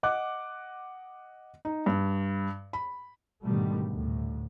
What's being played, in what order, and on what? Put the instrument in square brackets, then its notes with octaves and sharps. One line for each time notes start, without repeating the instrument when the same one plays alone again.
[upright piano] D#5 F#5 D6 F#6
[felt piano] D#4
G2
B5
[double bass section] G#2 B2 D3 D#3 G3 A3
D2 A2